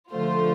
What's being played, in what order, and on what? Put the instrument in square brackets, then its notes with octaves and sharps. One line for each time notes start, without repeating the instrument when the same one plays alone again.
[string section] D3 F3 A3 F4 C5